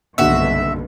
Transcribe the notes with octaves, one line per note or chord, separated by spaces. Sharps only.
F#1 B1 G2 B2 D3 F#4 E5